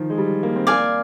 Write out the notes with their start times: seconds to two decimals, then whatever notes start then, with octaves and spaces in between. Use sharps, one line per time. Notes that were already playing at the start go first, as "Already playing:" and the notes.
Already playing: D#3 F3
0.10 G#3
0.18 G3
0.43 A#3
0.56 C4
0.67 A#3 D5 F5 G#5